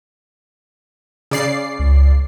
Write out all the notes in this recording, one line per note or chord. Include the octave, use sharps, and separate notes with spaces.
C#3 D5 C7
C#2